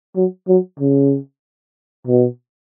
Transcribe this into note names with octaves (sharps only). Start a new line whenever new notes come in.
F#3
F#3
C#3
B2